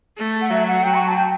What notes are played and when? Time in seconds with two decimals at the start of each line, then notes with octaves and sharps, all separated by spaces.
0.18 A3
0.41 F#5
0.50 F#3 E5
0.67 F#5
0.83 F#3 G5
0.95 C#6
1.06 A5
1.16 G5